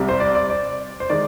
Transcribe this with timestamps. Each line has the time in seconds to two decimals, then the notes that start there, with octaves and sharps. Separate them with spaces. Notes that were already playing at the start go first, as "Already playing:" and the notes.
Already playing: C2 C3 G3
0.09 C5
0.20 D5
0.35 D5
0.50 D5
1.00 C5
1.09 D#3 G#3 D5